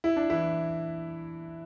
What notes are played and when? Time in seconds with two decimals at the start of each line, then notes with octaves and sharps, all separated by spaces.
0.04 E4
0.16 D4
0.30 E3 E4